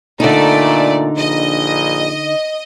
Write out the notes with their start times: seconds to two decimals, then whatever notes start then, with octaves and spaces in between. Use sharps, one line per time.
0.20 A#2 D3 A3 D#4 D5
1.18 A#1 D#5